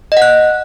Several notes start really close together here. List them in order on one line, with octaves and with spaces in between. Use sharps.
D#5 F#5 F#6